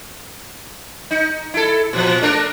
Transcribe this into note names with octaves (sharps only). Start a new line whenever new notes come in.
D#4
E4 A4
A#2 F3
A3 D4 A#4